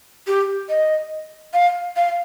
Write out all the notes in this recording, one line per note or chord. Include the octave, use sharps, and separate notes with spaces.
G4
D#5
F5
F5